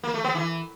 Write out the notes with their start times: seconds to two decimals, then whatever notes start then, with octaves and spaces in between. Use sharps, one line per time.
0.03 A#3
0.14 A3
0.24 B3
0.35 E3